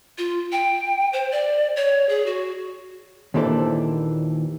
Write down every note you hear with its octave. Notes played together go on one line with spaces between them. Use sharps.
F4
G5
C5
D5
C#5
G#4
F#4
D#2 A#2 E3 D4 A4 C5